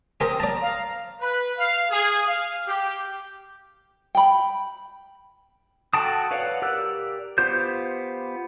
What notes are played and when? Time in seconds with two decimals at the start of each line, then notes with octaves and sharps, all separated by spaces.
0.20 C4 G4 A#4 G#5 D#6
0.40 D5 A5 A#5
0.62 F5
1.21 B4
1.58 F5
1.91 G#4
2.26 F5
2.67 G4
4.15 G5 B5
5.94 F#4 A4 G5 A5 D#6
6.31 B4 C#5 D5 F5 F#5
6.62 G4 A#4 D5 E6 F#6
7.38 B3 F4 G4 C5 G6